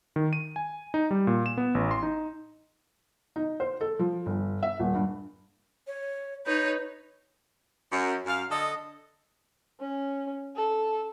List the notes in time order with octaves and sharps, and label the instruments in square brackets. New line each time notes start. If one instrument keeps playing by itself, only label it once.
[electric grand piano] D#3
D#7
G#5
D#4
G3
A#2
E7
B3
A1
C6
D#4
[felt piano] D#4
C5
A4
F3
G1
E5
D#1
G2
[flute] C#5
[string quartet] D#4 B4 C#5 [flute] G6
[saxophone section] F#2
F#2 F5
D3 A4 D#5
[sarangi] C#4
A4